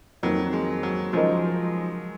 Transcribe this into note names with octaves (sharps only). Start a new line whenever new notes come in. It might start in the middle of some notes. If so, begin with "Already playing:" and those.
F2 D#3 F#3 A#3
G#3
F#3
C#3 F3 F#3 G#3 D#4 A#4